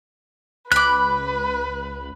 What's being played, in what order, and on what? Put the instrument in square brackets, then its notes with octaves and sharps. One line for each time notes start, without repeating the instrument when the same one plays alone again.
[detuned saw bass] C#2 [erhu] B4 [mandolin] B5 D6 [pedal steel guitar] F#6